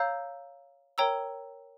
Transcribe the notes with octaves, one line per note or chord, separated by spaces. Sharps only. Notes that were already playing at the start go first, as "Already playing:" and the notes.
Already playing: C#5 F5 A#5 E6 G6
A#4 C#5 G5 A#5 E6